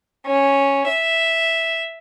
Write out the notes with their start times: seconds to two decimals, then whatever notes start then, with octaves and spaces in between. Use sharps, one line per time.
0.25 C#4
0.87 E5